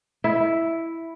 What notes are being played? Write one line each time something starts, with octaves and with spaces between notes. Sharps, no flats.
E4